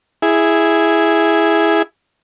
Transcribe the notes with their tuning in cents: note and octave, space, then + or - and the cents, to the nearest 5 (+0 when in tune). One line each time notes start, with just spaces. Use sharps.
E4 +0 G#4 +0